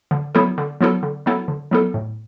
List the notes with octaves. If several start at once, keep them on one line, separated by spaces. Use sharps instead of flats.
D3
F#3 B3 E4 A4
D3
F#3 B3 E4 A4
D3
F#3 B3 E4 A4
D3
F#3 B3 E4 A4
A2